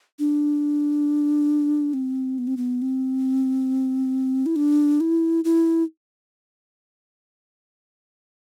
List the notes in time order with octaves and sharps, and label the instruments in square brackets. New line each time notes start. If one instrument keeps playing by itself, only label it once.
[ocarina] D4
C4
B3
C4
B3
C4
E4
D4
E4
E4